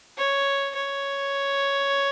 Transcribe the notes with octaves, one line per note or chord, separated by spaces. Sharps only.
C#5
C#5